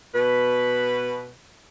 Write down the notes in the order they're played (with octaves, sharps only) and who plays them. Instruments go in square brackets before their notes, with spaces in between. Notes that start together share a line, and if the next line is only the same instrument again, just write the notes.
[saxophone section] B2 B4